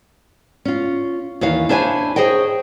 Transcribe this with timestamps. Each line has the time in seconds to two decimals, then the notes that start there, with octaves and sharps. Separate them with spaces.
0.65 C#4 F4
1.41 D#2 E3 C#5 F5
1.69 D4 E4 C5 C#5 G#5
2.16 G#4 C5 C#5 D#5 G5